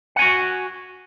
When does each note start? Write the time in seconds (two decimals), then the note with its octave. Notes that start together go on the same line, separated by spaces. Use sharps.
0.16 F#5
0.19 G#5
0.22 F#4